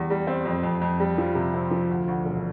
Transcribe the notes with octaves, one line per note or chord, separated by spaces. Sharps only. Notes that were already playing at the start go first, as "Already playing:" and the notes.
Already playing: E2 G3
G3
C4
F2
F2
F2
G3
F3
C3
C4
F3
D2
D2
E1